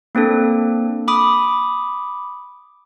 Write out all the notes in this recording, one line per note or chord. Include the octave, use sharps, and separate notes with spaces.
A#3 C4 D4 A4
B5 D6 D#6